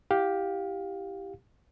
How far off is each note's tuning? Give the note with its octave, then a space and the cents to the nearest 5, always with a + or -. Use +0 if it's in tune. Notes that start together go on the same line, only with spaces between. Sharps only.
E4 +0 G4 +0 F5 +20